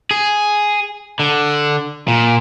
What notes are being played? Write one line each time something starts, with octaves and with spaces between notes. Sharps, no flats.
G#4
D3
A#2